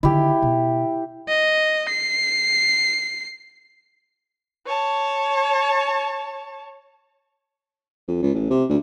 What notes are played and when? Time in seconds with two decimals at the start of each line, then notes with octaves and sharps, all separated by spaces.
0.03 D3 D#3 E4 G4
0.42 B2
1.29 D#5
1.89 C7
4.67 C#5 A5
8.07 F2
8.22 C#2
8.34 A1
8.50 C3
8.69 D2